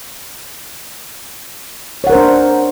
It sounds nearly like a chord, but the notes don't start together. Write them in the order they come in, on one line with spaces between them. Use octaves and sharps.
C#5 F#5 A#4 C5 D4